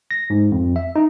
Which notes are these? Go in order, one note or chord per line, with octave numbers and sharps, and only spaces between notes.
A#6
G#2
F2
E5
D#4